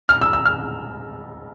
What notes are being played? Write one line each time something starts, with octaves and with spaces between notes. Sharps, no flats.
F6
E6
E6
F6